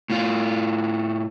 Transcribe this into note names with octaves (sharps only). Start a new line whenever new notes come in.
A2 F4